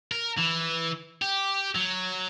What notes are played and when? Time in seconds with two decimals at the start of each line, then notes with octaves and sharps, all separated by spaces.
0.12 A#4
0.38 E3
1.22 G4
1.75 F#3